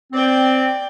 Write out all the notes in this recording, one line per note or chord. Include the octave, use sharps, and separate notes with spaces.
C4 D5 G5